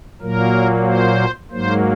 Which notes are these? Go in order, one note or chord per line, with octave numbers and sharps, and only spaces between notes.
A#2 F#3 A#3 A#4
C5
G#2 F#3 A#3 C5